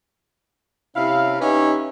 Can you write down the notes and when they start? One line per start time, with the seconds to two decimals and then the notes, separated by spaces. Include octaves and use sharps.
0.95 C3 C#4 E4 F5
1.40 C#4 D#4 G4 B4 C#5 E5